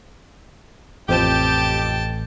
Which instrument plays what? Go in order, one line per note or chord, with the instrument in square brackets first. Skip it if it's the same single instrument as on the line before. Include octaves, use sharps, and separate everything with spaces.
[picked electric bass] A1 [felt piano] F2 C5 E7 [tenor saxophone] G4 [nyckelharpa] G5 A5